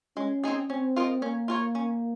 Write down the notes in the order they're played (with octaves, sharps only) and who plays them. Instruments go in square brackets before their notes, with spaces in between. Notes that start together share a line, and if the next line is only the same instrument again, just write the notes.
[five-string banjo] G#3 [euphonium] C#4
[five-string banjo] C4 D#4 G#4
[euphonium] C4 [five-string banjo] C#4
[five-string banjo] F4 A#4 D#5
[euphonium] A#3 [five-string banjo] C#4
[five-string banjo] F4 A#4 C#5
C#4